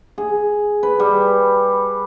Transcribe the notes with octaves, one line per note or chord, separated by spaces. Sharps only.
G#4
B4
G3